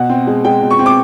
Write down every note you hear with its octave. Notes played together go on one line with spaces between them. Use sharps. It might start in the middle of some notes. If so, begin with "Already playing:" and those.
Already playing: B2 F#5
C4
G#3
G#3 G5
B2
C#6
C4
D6